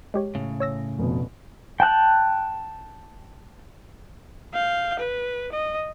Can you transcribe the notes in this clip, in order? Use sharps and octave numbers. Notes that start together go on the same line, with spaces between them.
G#3 G4 C#5
A2 C#3
C#5 E6 A#6
F1 B2
G5 A5 F#6
F5 G6
B4
D#5